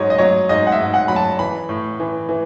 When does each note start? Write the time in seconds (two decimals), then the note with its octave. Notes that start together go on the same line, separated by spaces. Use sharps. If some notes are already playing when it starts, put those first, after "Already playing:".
Already playing: G#2 F#3 C#5 D#5
0.10 D#5
0.18 F#3 C#5
0.49 G#2 D#5
0.67 F#5
0.72 E5
0.79 G#2
0.94 F#5
1.08 F#3 B5
1.16 A5
1.39 E3 B5
1.69 A2
2.00 E3
2.29 E3